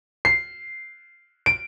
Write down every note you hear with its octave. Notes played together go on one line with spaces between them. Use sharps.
C7
D7